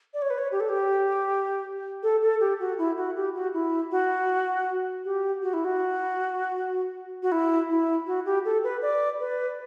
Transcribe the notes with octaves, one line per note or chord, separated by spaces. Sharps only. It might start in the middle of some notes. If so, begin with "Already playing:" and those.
D5
C#5
B4
C#5
G4
A4
G4
A4
A4
G4
F#4
E4
F#4
G4
F#4
E4
F#4
G4
F#4
E4
F#4
F#4
E4
E4
F#4
G4
A4
B4
D5
B4